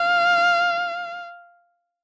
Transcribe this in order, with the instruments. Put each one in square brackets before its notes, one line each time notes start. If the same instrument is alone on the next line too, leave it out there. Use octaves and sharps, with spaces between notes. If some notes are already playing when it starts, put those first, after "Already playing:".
Already playing: [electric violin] F5